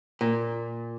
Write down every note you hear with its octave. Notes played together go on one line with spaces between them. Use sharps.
A#2